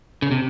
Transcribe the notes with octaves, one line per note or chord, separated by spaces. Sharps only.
C#3
C3